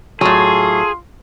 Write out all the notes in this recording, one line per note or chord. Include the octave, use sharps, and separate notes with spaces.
A2 F#3 F4 G#4 A4 C6